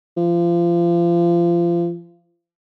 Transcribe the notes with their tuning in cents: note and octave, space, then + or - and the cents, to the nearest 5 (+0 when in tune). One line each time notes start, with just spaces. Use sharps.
F3 -30